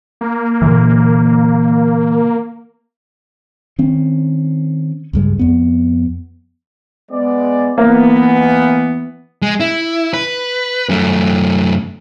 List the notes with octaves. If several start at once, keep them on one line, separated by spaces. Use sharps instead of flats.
A#3
A#2 D3 E3
D#3 C4 C#4
C#2 G2 G#3
F2 B3
G#3 B3 D5
E3 A#3 B3
G#3
E4
B4
F#2 A3